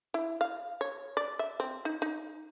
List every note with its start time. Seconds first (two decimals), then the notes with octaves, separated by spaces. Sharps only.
0.14 E4
0.41 F5
0.81 C#5
1.17 D5
1.39 E5
1.60 C4
1.85 D#4
2.02 D#4